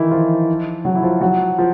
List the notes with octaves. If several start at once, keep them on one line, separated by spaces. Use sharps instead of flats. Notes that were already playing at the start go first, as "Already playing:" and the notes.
Already playing: D#3 E3 D#4 E4
F3 F4
F#3 F#4
E4
F3 F4
F#3 F#4
F3 F4